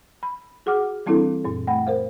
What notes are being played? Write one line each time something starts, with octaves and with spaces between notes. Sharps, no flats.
B5
F#4 G#4 F#5 D6 F6
E3 G3 C4 D4 E4 A4
F#2 A#2
A3 F#5 B5
A#4 C5 F5